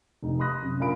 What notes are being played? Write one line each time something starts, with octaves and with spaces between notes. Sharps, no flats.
F1 D#4
B5 C6 D#6 F#6 A#6
F#2 C3
A#2 D4 A#4 F5 B5 D7